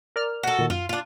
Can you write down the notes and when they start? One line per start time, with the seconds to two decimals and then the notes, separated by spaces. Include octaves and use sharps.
0.16 A#4 D5 F6
0.43 F#4 A4
0.59 A#2 D#3
0.70 F#2 F4
0.89 D4 F4